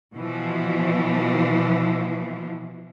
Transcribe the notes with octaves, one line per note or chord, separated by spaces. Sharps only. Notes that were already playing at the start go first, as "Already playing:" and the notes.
B2 E3 F3